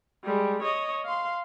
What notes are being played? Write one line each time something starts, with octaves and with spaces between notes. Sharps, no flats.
G3 G#3
C#5 D#5
F5 C6